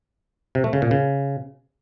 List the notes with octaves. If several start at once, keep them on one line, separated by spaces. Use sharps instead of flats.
C3
A3
C#3
A#2
C#3